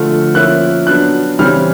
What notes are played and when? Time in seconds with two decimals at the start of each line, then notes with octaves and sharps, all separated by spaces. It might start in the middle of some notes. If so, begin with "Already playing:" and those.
Already playing: D3 F3 A3 F6
0.35 F3 A#3 C#4 E4 F#6
0.86 F#3 B3 D4 F#6
1.39 C#3 E3 G3 C4 F6